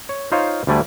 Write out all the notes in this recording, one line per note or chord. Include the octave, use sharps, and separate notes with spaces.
C#5
D#4 F4 C5 C#5 F5
D2 D3 G3 A3 D5 G#5